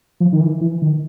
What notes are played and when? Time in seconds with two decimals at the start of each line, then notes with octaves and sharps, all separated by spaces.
0.20 F3
0.32 D#3
0.41 E3
0.61 E3
0.82 D#3